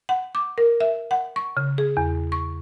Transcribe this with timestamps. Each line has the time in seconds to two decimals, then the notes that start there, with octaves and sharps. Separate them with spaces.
0.09 F#5
0.35 D6
0.58 A#4
0.81 E5
1.11 F#5
1.36 C#6
1.57 C#3
1.78 G#4
1.97 E2
2.32 C#6